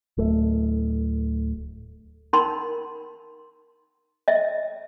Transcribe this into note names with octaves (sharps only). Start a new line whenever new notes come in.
D1 A3
D#4 A#4 F#5 B5 C6
D#5 E5